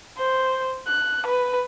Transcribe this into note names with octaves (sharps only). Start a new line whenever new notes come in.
C5
F#6
B4